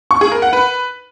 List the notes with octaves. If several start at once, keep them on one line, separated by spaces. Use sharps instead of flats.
C#6
G#4
A#4
F#5
B4